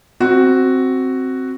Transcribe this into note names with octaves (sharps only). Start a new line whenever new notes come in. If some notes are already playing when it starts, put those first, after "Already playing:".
C4 F#4